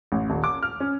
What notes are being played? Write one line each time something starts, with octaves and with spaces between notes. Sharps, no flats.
A1
D#1
D6
F6
C#4